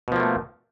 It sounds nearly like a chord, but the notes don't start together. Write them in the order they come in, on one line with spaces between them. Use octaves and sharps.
B2 F3 A#3 A3